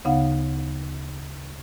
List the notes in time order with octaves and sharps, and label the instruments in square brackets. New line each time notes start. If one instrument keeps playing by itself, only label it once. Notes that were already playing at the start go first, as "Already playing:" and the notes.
[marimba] D2 C#3 B3 D#4 F5 F#5